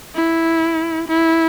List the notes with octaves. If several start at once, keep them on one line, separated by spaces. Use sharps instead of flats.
E4
E4